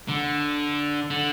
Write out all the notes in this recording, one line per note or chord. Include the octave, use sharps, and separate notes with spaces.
D3
D3